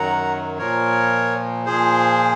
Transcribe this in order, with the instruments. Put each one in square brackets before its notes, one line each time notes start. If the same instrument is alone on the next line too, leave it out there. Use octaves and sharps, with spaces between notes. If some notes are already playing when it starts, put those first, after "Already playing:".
Already playing: [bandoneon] F#2 D#3 F#3 F#5 A#5
A#2 F3 A#4 C#5
A#2 F3 G#4 C5